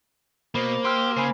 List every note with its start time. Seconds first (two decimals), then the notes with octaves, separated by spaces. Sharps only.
0.55 B2 A#3 C5 B5
0.85 G4 C6 E6 F6
1.17 C#3 C5 G#5 B5